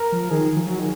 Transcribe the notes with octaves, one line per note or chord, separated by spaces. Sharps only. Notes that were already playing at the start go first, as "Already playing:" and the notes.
Already playing: A#4
F3
D#3 G#4
F3
F#3
D#3